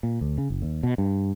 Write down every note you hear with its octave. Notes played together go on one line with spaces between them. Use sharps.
A#2
D2
C#3
F#1
D#2
B2
G2